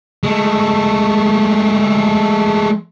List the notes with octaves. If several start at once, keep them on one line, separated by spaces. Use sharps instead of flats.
G#3 A3